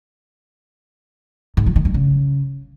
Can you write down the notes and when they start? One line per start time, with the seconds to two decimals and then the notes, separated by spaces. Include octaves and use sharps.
1.57 G#2
1.66 F3
1.76 D#3
1.85 G2
1.94 C#3